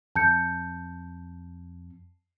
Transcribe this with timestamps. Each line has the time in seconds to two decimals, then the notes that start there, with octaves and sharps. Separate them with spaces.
0.16 F2 A5 G6 C#7